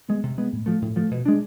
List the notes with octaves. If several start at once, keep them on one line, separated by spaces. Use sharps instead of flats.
G#3 B3
C3
G#3 B3
A2
F3 A3
A2
F3 A3
B2
G#3 D4